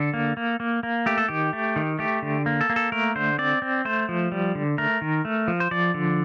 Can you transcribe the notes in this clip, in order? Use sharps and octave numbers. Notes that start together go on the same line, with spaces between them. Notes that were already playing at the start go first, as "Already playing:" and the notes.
Already playing: D3 A4
A#3
A#3
A#3
A#3
A3 G4
A4
D#3 G4
A3
D#3
A3 G4
D3
A#3
A4
A#3
A4
A3 A#4
D3 C5
C4 D5
C4
A3 C5
F3
G3
D3
A3 A#4
D#3
A3
F3
C5
F3 D5
D3